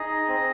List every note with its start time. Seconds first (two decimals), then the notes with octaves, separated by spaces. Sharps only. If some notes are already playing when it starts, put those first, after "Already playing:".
Already playing: D#4 G#4 D#5
0.28 C4